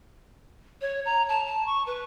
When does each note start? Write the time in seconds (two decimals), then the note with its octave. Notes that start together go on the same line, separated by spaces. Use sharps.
0.81 C#5
1.05 A#5
1.29 A5
1.47 A5
1.66 C#6
1.87 B4